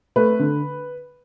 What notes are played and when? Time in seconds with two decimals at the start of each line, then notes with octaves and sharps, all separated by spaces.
0.16 A3 B4
0.39 D3